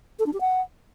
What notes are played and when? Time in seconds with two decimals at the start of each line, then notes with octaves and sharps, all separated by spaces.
0.19 A4
0.26 D4
0.33 G4
0.41 F#5